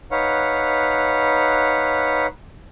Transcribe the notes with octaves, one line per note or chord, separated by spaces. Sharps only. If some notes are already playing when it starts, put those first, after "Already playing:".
D#4 B4 C#5 F5 F#5